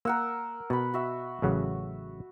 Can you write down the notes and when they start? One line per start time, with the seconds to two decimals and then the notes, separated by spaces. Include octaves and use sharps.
0.05 A#3 A#4 F#5 E6
0.70 B2 F#5 B5
0.94 F#4 E5
1.42 A1 C#3 F#3